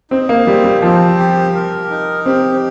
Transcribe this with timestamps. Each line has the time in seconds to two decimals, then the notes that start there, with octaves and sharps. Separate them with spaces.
0.11 C4 D#4
0.29 A#3
0.47 G3 C4
0.64 G3
0.82 F3 C4
1.18 G4
1.54 A#4
1.90 D#4
2.25 C4 G4